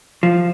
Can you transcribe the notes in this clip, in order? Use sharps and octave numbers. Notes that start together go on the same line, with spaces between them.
F3